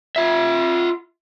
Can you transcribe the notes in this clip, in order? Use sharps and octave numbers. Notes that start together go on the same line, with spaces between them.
F4 E5